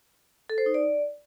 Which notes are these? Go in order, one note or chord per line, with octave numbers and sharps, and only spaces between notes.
A4
C5
D#4
D5